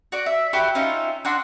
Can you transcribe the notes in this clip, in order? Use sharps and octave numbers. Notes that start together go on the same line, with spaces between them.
F#4 D5
E5
F#4 G4 E5 B5
C#4 D#4 F4 E5
D4 F#4 C6